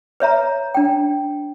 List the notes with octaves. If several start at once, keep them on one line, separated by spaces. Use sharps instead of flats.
B4 C#5 E5 A#5
D4 G5